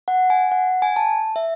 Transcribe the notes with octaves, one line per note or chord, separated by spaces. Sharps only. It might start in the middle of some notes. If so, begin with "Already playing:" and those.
F#5
G#5
F#5
G#5
A5
E5